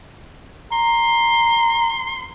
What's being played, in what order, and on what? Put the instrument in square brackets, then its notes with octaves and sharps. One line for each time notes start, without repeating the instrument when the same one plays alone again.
[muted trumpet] A#5 [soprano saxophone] C6